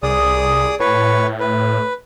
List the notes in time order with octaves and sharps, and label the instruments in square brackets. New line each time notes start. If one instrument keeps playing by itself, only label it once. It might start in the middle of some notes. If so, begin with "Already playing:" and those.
[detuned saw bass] C2 [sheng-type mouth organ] G#4 D5 D#6
[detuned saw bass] A2 [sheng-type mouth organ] B4 C#5
[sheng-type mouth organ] B4